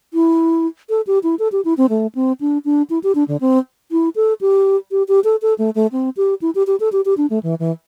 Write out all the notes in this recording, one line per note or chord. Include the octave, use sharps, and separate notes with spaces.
E4
A4
G4
E4
A4
G4
E4
C4
A3
C4
D4
D4
E4
G4
D4
D3
C4
E4
A4
G4
G4
G4
A4
A4
A3
A3
C4
G4
E4
G4
G4
A4
G4
G4
D4
A3
E3
E3